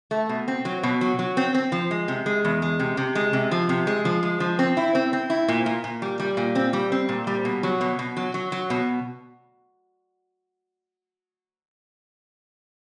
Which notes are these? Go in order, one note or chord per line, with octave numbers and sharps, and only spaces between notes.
A3
B2
C4
F#3
B2
F#3
F#3
C4
C4
F3
G#3
C3
G#3
E2
G#3
C3
C3
G#3
C3
F3
C3
G#3
F3
G#3
F3
C4
E4
C4
C4
E4
A#2
A#2
A#2
G3
G3
A#2
C4
G3
C4
A#2
G3
B2
F#3
B2
B2
F#3
F#3
F#3
B2